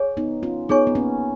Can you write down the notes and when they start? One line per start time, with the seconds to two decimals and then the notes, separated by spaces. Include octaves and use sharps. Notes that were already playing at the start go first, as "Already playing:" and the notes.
Already playing: G#4 C#5 G#5 C#6
0.17 B3 D#4
0.43 C#4 F4
0.69 B3 D#4 G#4 C#5 G#5 C#6
0.87 B3
0.95 A#3 C#4